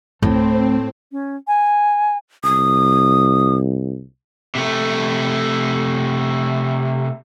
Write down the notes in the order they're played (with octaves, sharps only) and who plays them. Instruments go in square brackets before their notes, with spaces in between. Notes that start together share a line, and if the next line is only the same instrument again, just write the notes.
[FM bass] D1 [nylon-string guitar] A2 [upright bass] A3 [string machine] C4
[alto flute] C#4
G#5
[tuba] C2 [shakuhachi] D#6
[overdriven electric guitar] C3 A3